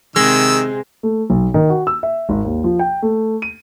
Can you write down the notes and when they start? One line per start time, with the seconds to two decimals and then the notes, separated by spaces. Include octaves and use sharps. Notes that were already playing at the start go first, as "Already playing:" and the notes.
0.16 C3 D#3 G#3 C4 E6
1.03 A3
1.30 B1
1.54 D#3
1.69 F#4
1.87 E6
2.03 E5
2.29 G#1
2.45 D#2
2.64 F3
2.79 G5
3.02 A3
3.42 D#7